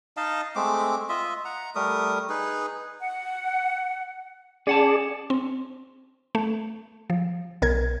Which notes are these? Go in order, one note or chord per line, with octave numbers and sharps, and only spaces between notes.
D#4 D#5 F5 A5
G#3 A3 C4 D6
F4 D#5 E5
F#5 A#5
G3 A3 A#4 D#6
D#4 G#4 B4
F#5
C#4 G#4 D5 F#5 A5
C4
A3
F3
B1 A#4 G#6